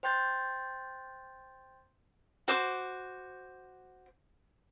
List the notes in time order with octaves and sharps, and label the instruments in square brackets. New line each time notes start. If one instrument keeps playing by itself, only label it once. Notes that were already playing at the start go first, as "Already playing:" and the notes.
[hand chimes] C5 G5 C6 G6 A6
[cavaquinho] F#4 C5 D6